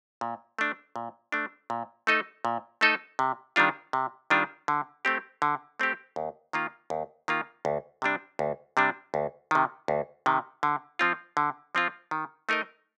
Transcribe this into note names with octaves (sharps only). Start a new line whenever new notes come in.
A#2
A3 D4
A#2
A3 D4
A#2
A3 D#4 A4 D#5
A#2
A3 D#4 A4 D#5
C3
D#3 G3 D4 F4
C3
D#3 G3 D4 F4
D3
A3 C4 G4
D3
A3 C4 G4
D#2
D#3 A#3 F4
D#2
D#3 A#3 F4
D2
C3 G3 D4
D2
C3 G3 D4
D2
C3 D#3
D2
C3 D#3
D3
F3 C4 F4
D3
F3 C4 F4
D#3
A3 D#4 A#4 D#5